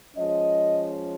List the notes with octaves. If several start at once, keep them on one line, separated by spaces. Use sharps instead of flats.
F3 G#3 C#4 D#5